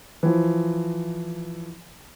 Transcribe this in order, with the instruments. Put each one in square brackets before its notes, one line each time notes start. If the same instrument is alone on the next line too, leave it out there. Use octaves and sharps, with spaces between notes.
[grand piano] E3 F3